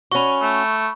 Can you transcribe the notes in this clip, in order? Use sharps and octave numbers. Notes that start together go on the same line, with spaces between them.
C#4 F#4 B5 C#6
A3